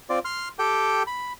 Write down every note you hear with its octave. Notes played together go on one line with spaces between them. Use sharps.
C4 F4 D5
C6 F6
G4 A4 G5
B5